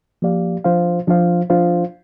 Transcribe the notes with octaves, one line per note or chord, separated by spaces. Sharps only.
F3 A#3 G4 D5 F5
F3 D4 F4 C5 F5
F3 D4 F4 C5 F5
F3 D4 F4 C5 F5